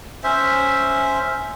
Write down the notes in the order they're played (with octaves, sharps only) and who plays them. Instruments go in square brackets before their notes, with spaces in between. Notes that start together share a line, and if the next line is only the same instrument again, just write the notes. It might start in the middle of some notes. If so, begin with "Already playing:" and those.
[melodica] C#4 C5 E5